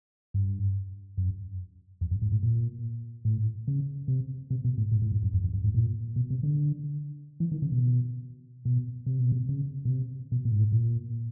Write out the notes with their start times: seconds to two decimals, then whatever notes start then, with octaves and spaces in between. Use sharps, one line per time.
0.34 G2
1.17 F#2
2.01 F2
2.11 F#2
2.22 G#2
2.32 A2
2.43 A#2
3.25 A2
3.68 C#3
4.08 C3
4.50 C3
4.64 B2
4.78 A2
4.92 A2
5.02 A2
5.12 G2
5.23 F#2
5.33 F2
5.44 F2
5.53 F#2
5.64 G#2
5.74 A#2
6.16 B2
6.30 C3
6.43 D3
7.40 E3
7.52 D#3
7.62 C#3
7.72 B2
8.65 B2
9.06 C3
9.19 B2
9.32 C3
9.49 C#3
9.85 B2
9.90 C3
10.32 B2
10.45 A#2
10.52 G#2
10.59 A2
10.72 A#2